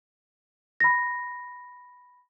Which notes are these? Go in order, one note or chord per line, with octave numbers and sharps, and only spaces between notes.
B5 A#6